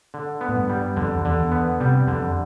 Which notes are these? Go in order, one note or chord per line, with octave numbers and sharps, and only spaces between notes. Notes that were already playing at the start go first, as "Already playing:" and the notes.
D3
B3
A2
G2
G3
F2 D3
E2
D3
E2
B3
C3 G3
F2 D3